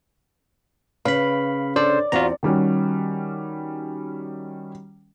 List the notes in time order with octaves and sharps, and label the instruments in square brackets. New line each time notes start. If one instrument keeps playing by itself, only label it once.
[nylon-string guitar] C#3 [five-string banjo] B4 [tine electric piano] F5 B5
[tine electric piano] D4 A4 C5 [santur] D5
[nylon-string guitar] E2 C4 [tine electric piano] F4 F#4 A#5
[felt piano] D#3 G3 C#4 F#4